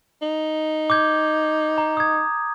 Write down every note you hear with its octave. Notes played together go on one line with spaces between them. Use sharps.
D#4
D6 G6 G#6
A#5
D#6 G#6